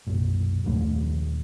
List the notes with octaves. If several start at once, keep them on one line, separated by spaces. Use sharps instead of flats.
B1 F#2 A#2
D#2 A#2 F3 A3